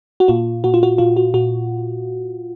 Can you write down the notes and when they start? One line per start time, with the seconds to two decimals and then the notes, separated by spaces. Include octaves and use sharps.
0.20 F#4
0.28 A#2 F4
0.64 A#2 F#4
0.74 F4
0.83 F#4
0.98 A#2 F4
1.17 F#4
1.34 A#2 F#4